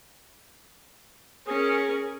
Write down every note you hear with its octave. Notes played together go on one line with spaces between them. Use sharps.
C#4 G#4 A#4